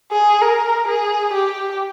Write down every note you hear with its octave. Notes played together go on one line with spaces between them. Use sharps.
G#4
A#4
G#4
G4